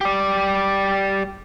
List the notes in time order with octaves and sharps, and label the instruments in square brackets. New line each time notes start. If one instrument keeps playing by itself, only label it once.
[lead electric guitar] G4 D5